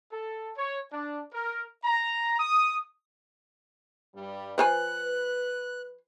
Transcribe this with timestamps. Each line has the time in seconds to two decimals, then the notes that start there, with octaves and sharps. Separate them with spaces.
0.10 A4
0.56 C#5
0.92 D4
1.32 A#4
1.83 A#5
2.38 D#6
4.15 G2 G3
4.58 F3 B4 C5 G#5 F#6